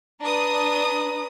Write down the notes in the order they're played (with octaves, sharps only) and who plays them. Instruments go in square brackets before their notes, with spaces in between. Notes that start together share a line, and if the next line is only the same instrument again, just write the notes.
[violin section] D4 D#6 [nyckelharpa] B4 A#5